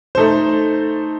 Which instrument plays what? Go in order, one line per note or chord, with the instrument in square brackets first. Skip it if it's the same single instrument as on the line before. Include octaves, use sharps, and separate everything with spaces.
[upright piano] A3 D#4 A4 C5